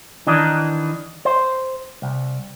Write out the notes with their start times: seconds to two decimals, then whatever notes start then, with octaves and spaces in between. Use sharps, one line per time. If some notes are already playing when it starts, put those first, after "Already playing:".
0.27 D#3 E3 D4 D#4
1.25 C5
2.02 C2